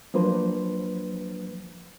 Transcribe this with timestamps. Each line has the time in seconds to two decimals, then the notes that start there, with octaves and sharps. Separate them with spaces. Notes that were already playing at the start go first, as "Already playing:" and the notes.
0.14 F3 F#3 A#3 D4 B4 C5